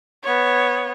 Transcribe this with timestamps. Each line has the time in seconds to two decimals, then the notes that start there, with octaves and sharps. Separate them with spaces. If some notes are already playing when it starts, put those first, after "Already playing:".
0.23 B3 C#5